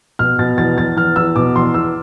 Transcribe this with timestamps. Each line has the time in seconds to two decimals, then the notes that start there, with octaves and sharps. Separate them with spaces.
0.19 B2 F6
0.39 B2 A6
0.57 E2 A6
0.77 E2 A6
0.96 E2 F6
1.16 E2 E6
1.36 B2 D6
1.55 E2 C6
1.74 E2 E6